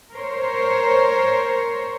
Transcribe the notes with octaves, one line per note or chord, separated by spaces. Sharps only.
A#4 C5 C#5